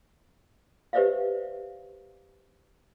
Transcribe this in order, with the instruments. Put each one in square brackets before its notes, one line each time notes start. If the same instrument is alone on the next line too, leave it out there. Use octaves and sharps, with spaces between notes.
[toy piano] G4 B4 C5 D5 E5 F5